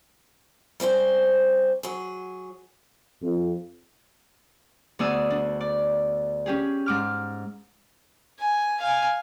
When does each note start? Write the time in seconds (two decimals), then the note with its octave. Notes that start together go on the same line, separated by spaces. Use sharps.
0.80 G3 C4 C#4 C5
1.83 F#3 G#4
3.22 F2
4.99 D2 B3 G#4 D5 D#6 E6
5.30 D4
5.61 D5
6.46 C#4 G4 G#4
6.86 G#2 D6 F6
8.39 G#5
8.79 F5 G#5